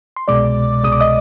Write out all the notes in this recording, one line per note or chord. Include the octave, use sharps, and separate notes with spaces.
C6
C2 B2 G#3 D5 D6
C2 B2 G#3 D#6
D6
D#5 D#6